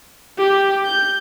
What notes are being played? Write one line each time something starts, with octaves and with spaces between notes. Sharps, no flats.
G4
G6